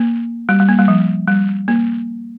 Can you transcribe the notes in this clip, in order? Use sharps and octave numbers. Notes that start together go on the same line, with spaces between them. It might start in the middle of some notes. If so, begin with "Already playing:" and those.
Already playing: A#3
G3
G3
A#3
G3
F3
G3
A#3